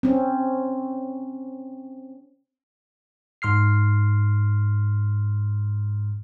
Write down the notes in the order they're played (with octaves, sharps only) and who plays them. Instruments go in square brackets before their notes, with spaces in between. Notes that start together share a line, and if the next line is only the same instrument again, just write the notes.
[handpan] C4 C#4
[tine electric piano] G#2 C6 F6 C7